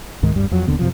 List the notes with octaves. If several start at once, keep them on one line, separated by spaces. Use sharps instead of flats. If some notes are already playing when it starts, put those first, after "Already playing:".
C#2 G#2 D#3 G#3
D1 G2 G3
F2 F#3
D#1 D#2 D3 B3
F#2 C3 F3